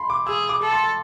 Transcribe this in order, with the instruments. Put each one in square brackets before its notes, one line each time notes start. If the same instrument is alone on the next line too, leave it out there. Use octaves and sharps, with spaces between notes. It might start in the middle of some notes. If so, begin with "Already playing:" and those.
Already playing: [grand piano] A5 B5 C6
D6
[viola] G#4 [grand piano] E6
[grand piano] D6
[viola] A4
[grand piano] C6